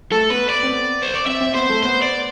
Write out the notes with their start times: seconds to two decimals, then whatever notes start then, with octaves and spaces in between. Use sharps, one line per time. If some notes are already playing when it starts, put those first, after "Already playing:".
0.11 A3 A4
0.30 B3 B4
0.49 D5
0.63 C4
0.69 B3
1.02 C5
1.14 D5
1.26 C4 E5
1.41 C4
1.54 B3 C5
1.69 A3
1.83 B3 C5
2.02 D5